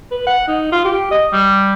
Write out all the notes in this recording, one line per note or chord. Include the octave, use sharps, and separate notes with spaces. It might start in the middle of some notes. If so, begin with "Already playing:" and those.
B4
F#5
D#4
F4
G4
D#5
G3